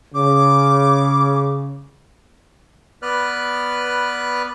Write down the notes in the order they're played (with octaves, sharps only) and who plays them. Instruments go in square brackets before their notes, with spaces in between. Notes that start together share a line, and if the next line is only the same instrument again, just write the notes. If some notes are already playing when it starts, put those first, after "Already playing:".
[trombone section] C#3 [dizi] D6
[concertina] B3 B4 D5 F6 F#6